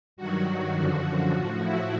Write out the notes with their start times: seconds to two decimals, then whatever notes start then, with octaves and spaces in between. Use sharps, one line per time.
0.17 G2 D#3 F#3 F#4
0.76 F#2 D3 F3
1.34 A2 F3 F#4
1.62 E4